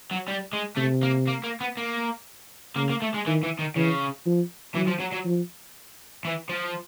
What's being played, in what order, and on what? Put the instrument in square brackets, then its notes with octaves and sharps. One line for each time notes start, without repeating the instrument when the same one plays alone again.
[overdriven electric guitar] F#3
G3
G#3
[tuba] C3 [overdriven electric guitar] A3
[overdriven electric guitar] A#3
A#3
A#3
B3
A#3
[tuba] C#3 [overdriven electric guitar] A#3
[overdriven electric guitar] A#3
A3
G#3
[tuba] D#3 [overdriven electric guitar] E3
[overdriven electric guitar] E3
D#3
[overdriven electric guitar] C#3 [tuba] E3
[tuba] F3
[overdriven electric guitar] E3 [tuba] F#3
[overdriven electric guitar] F3
F#3
F#3
[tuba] F3
[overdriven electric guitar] E3
F3